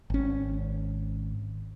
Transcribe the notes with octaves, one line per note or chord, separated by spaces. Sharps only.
G#1 C#4